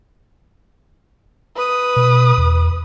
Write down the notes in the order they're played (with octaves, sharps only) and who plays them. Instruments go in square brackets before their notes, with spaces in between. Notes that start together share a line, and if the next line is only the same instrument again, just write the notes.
[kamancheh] B4 D#6
[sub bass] B2
E2